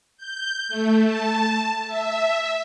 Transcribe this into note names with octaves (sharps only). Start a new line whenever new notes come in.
G6
A3
A5
E5